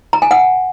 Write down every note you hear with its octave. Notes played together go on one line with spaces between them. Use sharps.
A#5
G#5
F#5